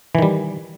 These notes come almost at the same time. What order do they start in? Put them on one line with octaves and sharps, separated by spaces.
E3 D#3 G3